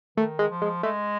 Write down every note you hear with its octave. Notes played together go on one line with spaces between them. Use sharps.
D#3 A3
G#3
F3
G#3
G#3 A3